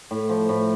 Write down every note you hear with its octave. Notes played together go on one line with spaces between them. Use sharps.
A2
F3
A2